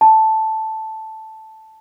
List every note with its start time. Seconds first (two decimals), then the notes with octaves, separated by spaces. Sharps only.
0.01 A5